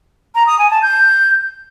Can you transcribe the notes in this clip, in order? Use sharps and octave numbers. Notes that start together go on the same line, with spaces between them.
A#5
D#6
G#5
A5
G6